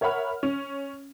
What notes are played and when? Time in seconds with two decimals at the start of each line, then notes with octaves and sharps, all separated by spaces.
0.01 A#4 C#5 E5 F#5 B5 F6
0.43 C#4